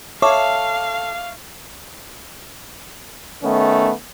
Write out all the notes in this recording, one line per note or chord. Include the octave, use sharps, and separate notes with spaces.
A4 C#5 E5 F5 C#6 D6
D#3 A3 B3 C#4